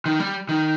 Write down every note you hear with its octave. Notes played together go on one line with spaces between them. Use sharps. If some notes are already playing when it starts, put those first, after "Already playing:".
D#3
G3
D#3